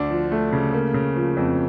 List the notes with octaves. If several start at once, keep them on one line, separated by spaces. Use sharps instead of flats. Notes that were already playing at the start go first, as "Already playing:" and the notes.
Already playing: D2 D4
F3
A3
C#3
A#3
C#3
F3
F2